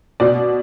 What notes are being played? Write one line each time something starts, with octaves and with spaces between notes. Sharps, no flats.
B2 D5